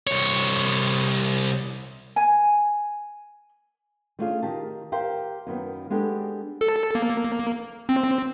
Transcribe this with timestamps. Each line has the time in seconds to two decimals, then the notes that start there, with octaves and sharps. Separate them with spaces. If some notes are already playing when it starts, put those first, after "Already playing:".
0.07 C2 C#5
2.16 G#5
4.19 G3 A3 C#4 D4 F4 G#4
4.42 D#3 G4 A5
4.92 G4 A#4 C5 F5 G5
5.47 F#2 D#3 B3
5.90 G#3 B3 D4 G4 A4
6.61 A4
6.95 A#3
7.89 C4